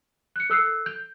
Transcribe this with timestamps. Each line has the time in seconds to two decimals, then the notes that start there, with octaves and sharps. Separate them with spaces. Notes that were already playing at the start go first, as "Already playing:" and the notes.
0.36 F#6 C#7
0.50 A4 E6 F#6 C7
0.86 G6